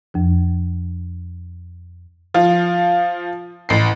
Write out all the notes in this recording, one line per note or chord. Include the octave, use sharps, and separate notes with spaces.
F2 F3
F3 F4
A1 C7